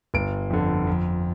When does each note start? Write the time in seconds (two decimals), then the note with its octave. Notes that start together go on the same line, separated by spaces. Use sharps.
0.14 G1 D7
0.50 F2 D3
0.87 F2